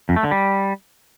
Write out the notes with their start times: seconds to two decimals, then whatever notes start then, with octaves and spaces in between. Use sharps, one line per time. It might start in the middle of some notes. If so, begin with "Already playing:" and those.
0.09 F2
0.16 A3
0.24 D3
0.31 G3